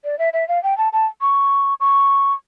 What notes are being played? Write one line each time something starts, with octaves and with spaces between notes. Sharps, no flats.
D5
E5
E5
F5
G5
A5
A5
C#6
C#6